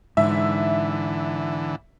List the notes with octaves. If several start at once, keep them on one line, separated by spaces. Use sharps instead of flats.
G#2 D3 E3 E5